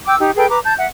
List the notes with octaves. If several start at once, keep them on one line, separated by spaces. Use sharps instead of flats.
G5 D6 E6
D#4 G4
G#4 A4 B4 G5
B4 A#5 D6
A5 G6
E5 F#5